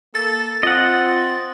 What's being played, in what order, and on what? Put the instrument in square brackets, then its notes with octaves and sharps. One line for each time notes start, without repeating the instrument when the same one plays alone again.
[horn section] A#3 A4 [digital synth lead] A6
[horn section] C4 [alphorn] F4 [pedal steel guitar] D#5 F#5